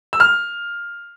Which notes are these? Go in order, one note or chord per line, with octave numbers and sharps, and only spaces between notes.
E6
F6